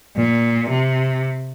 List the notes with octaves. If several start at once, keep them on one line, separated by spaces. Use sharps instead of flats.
A#2
C3